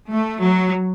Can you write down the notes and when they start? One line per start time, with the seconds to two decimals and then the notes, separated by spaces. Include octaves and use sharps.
0.09 A3
0.42 F#3